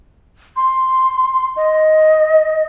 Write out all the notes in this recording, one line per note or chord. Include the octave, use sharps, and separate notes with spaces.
C6
D#5